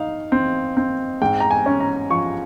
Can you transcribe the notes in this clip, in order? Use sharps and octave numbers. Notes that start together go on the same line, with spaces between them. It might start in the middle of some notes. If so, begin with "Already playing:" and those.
Already playing: D#4 F5
C4
C4
G#2 G5
A#5
G#5
C#4
A#5
F3 C#6